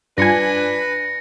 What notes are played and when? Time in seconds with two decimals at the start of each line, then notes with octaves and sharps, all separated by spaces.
0.18 G2 D4 F4 B4 G#5 A#6 C#7